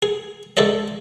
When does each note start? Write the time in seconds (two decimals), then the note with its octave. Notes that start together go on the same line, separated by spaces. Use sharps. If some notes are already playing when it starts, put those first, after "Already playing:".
0.03 G#4
0.57 C#2 G#4 A4 D5 D#5